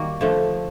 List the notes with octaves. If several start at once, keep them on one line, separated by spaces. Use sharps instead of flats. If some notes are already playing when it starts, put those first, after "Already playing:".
Already playing: D#3 G3 A#3 F#4
D3 F3 A3